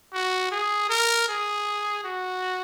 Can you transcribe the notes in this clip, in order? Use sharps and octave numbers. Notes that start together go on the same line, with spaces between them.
F#4
G#4
A#4
G#4
F#4